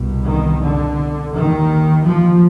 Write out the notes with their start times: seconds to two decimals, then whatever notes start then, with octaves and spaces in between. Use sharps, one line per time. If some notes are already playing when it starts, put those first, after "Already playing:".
Already playing: C2 B2
0.24 D#3
0.61 D3
1.33 D#2 D#3
2.05 F3